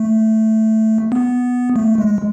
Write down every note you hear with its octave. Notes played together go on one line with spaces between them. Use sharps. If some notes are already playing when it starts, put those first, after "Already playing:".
Already playing: A3
B3
A3
G#3